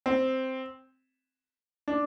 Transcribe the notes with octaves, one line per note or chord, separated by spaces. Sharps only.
C4
D4